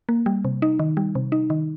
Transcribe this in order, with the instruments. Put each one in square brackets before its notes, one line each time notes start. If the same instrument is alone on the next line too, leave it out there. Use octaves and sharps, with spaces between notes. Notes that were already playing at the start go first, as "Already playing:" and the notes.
[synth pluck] A#3
G3
C3
D#4
D#3
G3
C3
D#4
D#3